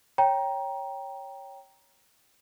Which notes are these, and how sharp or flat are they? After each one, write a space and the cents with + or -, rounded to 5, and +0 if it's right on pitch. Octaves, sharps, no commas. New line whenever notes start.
C#5 +0 G5 +0 A#5 +15